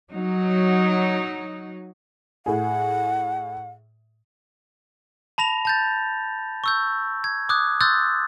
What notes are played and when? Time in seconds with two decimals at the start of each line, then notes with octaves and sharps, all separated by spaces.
0.12 F#3 D#4
2.46 A2 G#4 F#5
5.38 A5 B5 A#6 F7
5.65 A5 G6 A6
6.64 C#6 E6 G6
7.24 G#6
7.49 D6 D#6 F#6 G#6
7.80 C6 D#6 E6 F#6 G6 A6